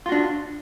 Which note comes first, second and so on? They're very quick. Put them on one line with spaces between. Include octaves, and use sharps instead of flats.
F4 F#4 D4